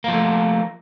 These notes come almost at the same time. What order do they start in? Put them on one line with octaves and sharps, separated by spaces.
A#3 F3 A3